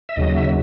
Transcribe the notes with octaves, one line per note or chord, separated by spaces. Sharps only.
E5
D#2 C#3 F#3 D#5
E5